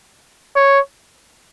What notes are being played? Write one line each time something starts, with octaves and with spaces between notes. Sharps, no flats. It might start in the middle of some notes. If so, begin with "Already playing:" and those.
C#5